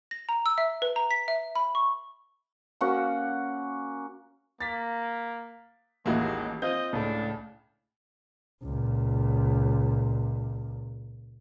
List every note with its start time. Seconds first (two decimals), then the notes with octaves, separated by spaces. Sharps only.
0.11 A#6
0.29 A#5
0.46 E6
0.58 E5
0.82 B4
0.96 A#5
1.11 B6
1.28 E5
1.55 B5
1.75 C#6
2.81 A#3 C#4 F#4 F#5
4.61 A#3 A6 B6
6.06 A1 D#2 G#3 A#3 E4 F#4
6.62 C4 F4 D#5 G6
6.93 C#2 A2 C#3 D4
8.63 C#2 A#2